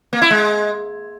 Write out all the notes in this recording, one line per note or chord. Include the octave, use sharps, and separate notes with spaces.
A#3
E4
G#3